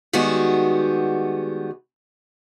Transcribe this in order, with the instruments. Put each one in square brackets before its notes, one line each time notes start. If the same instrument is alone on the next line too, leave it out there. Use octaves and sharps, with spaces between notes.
[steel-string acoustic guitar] D#3 G3 G#3 B3 F#4